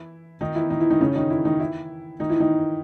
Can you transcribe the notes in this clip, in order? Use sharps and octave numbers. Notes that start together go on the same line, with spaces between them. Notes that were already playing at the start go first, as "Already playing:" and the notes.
Already playing: E3 E4
D#3 D#4
E3 E4
D#3 D#4
E3 E4
D#3 D#4
C#3 C#4
D#3 D#4
E3 E4
D#3 D#4
E3 E4
D#3 D#4
E3 E4
D#3 D#4